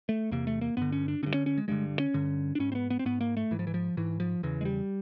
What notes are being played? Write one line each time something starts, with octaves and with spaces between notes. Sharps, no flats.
A3
E2 C3 A#3
A3
A#3
G2 D3 B3
C#4
D4
G2 D3 C#4
C#4
C#4
G#3
G2 D3 G#3
C#4
G2 D3
D4
G#2 C#4
C4
B3
B3
C4
G#2 B3
A#3
A3
G#2 E3
F3
E3
F3
G#2 E3
F3
E2 C#3 E3
G#3
G3